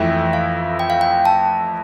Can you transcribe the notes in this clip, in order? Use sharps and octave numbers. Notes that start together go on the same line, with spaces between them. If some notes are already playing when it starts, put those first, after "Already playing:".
Already playing: F2 E3 A3 E4 G5
F5
G5
F5
G5
A5